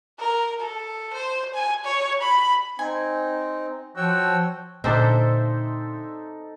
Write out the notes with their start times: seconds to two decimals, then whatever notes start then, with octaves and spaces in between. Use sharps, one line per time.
0.19 A#4
0.59 A4
1.14 C5
1.54 G#5
1.84 C#5
2.21 B5
2.79 C4 D#4 G#5
3.97 F3 F#4 C#5 G5 E6
4.84 A#2 D3 C4 D4 D#4 A4 C5 E5